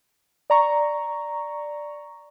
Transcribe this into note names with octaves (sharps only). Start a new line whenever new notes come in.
D5 A#5 C#6